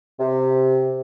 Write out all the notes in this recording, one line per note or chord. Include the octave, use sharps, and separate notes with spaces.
C3